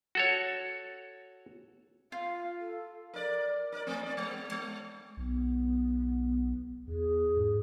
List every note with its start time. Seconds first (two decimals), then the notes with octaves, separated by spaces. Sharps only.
0.15 F#4 A4 C#5
2.12 F4 F5
2.60 A4
3.14 A#4 D5
3.72 A#4 D5
3.87 A3 C4
4.03 C4 D5
4.17 G#3
4.51 G#3
5.17 B1 B3
6.88 E2 G#4
7.37 G#2